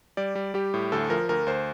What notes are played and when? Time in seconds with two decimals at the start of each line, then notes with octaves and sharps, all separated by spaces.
0.17 G3 D5
0.35 G3
0.54 G3 G4
0.74 A2
0.92 D2 A4
1.09 F3 A#4
1.29 D2 A#4
1.47 D2 C5